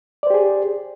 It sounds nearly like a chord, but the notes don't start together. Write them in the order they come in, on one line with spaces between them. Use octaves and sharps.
D5 C5 G4 G#4